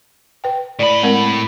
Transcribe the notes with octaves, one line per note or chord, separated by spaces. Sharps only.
B4 G5
A2 D5 B5
G#3 C4 A#4